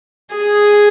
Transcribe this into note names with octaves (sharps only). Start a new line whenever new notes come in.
G#4